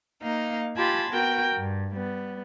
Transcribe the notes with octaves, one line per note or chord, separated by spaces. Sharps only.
A#3 D#4 F5
F4 G4 G#5 A5 B5 C6
B3 F#4 A#4 G5 G6
G2
G3 B3